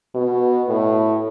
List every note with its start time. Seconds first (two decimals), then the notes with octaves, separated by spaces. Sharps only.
0.15 B2
0.68 A2